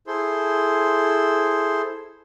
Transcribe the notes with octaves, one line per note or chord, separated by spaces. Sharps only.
E4 G#4 A4 C5 C6